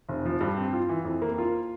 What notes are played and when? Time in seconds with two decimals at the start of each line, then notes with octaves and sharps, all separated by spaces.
0.09 F1
0.25 F3
0.41 G2
0.57 C4
0.73 F4
0.89 E3
1.05 F2
1.22 A#3
1.38 F4